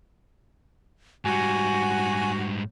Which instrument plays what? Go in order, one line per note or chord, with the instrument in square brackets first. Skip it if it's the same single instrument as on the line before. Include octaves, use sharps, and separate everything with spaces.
[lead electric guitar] G#2 G3 [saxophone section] F#4 [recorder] G#5